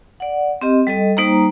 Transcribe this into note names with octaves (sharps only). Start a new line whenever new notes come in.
D5 F#5
C4 G4 D#5
G3 A4 D#5
G3 A#3 D#4 C5 A#5